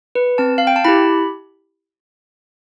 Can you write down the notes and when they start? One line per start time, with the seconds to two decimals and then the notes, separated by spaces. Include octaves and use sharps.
0.15 B4
0.38 C4 A5
0.58 F5
0.67 G5
0.76 A5
0.84 E4 G4 B5